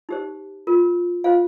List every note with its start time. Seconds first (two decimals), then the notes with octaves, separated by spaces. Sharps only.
0.09 D#4 G4 C5
0.67 F4 A#4
1.24 F4 C5 F5